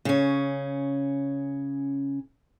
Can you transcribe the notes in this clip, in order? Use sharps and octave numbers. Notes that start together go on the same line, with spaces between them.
C#3 C#4